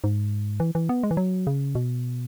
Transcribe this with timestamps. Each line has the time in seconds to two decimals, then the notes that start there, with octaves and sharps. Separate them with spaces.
0.04 G#2
0.60 E3
0.75 E3
0.89 B3
1.03 G#3
1.11 E3
1.17 F#3
1.47 C#3
1.75 B2